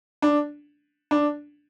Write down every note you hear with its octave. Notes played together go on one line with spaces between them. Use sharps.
D4
D4